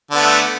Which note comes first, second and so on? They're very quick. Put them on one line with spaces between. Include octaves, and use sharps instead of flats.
D3 B3 A3